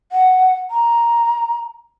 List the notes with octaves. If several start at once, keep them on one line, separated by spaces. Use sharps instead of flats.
F#5
A#5